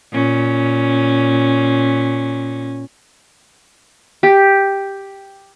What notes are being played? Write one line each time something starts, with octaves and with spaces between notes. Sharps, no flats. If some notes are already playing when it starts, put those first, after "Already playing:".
A#2 C#4
G4